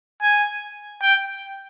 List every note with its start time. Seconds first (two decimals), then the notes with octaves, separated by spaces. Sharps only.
0.22 G#5
1.02 G5